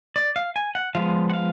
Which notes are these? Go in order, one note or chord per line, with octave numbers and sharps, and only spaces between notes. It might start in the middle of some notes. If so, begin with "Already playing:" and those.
D5
F5
G#5
F#5
F3 G#3 B3 F5
F#5
F5